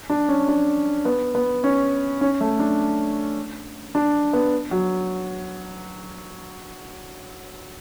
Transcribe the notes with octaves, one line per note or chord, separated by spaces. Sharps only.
D4
C#4
D4
B3
B3
C#4
C#4
A3
D4
D4
B3
F#3